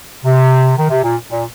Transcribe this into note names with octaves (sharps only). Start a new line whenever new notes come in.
C3
D#3
C3
A#2
A#2